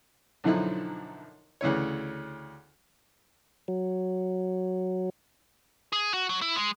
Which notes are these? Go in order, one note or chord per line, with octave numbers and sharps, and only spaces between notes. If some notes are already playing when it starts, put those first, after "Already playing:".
B1 F#2 D3 F3 D#4 E4
D2 C#3 E3 C#5
F#3
G#4
F#4
F#3
E4
G#3